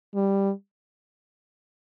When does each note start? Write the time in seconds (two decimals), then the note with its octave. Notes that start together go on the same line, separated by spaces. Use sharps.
0.15 G3